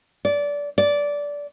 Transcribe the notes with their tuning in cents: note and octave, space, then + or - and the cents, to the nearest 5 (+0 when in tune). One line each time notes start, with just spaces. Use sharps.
D5 -20
D5 -15